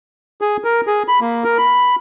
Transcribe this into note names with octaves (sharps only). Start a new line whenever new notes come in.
G#4
A#4
G#4
B5
A#3
A#4
B5